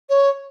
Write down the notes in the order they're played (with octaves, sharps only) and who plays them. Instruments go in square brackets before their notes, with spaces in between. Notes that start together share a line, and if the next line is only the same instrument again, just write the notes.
[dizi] C#5